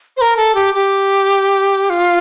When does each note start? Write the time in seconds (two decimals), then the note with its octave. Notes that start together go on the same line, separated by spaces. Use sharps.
0.17 C5
0.21 A#4
0.37 A4
0.55 G4
0.75 G4
1.90 F4